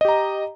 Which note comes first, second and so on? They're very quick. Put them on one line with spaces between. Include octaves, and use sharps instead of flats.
D#5 G4 A#5